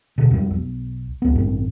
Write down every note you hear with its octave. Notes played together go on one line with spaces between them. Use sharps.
B2 D3
F2 G3
B1
C#2 B3
A1 G2 C4